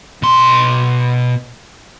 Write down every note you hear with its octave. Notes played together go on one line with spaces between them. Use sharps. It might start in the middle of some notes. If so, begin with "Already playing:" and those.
B2 C6